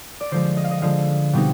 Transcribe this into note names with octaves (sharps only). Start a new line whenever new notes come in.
D5
D3 F3 G#3 C5
D#5
F5
D#5
D3 F3 G#3 F5
B2 G3 C4 D#4